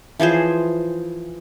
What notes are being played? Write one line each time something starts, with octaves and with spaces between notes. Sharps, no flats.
E3 F3 G#4 C5